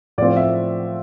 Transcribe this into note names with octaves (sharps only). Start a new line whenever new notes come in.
A2 F3 C4 D5
E5